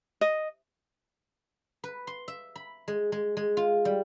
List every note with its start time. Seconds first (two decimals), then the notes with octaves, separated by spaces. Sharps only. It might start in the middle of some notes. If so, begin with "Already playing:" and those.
0.21 D#5
1.84 B4
2.07 C6
2.28 E5
2.56 B5
2.88 G#3
3.12 G#3
3.37 G#3
3.57 F4
3.85 G3